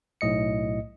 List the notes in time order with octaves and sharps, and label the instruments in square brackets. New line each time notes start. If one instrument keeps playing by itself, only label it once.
[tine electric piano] B1 A2 D#5 C#7